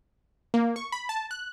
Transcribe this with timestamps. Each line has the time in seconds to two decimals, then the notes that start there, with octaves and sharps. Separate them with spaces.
0.54 A#3
0.76 C#6
0.92 B5
1.09 A5
1.31 F#6